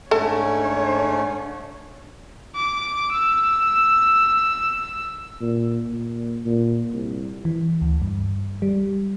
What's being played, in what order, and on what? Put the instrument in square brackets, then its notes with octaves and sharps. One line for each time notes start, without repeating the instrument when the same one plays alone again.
[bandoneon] G#2 A3 C#4 [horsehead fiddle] D4 C#5 [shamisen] A4 A5
[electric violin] D6
E6
[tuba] A#2
A#2
A#2
C2
[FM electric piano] E3
D2
G2
G3